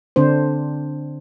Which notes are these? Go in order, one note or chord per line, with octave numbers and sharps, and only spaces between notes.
D3 C4 D4 C5